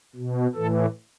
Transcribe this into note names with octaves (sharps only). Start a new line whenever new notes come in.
B2
A2 E3 A4